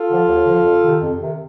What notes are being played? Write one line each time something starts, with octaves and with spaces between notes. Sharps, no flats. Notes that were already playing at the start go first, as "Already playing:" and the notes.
Already playing: F4 A4
D3 F3
D#2
D3 F3
F2
C3 D#3
F2
C3 D#3